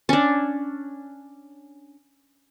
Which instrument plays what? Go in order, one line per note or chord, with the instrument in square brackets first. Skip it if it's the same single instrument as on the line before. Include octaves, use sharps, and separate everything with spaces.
[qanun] C#4 D4